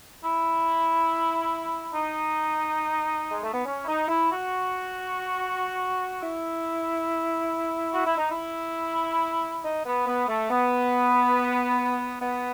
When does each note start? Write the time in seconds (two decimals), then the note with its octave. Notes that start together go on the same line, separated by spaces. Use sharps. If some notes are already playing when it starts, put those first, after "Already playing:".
0.23 E4
1.94 D#4
3.31 G#3
3.43 A3
3.54 B3
3.66 C#4
3.83 E4
3.87 D#4
4.08 E4
4.30 F#4
6.22 E4
7.93 F#4
8.06 E4
8.18 D#4
8.30 E4
9.65 D#4
9.86 B3
10.07 B3
10.28 A3
10.50 B3
12.21 B3